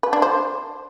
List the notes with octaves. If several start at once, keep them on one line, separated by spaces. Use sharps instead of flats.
B4
D4
C5